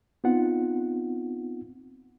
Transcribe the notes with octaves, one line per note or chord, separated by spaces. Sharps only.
B3 C4 D#4 F4 F#5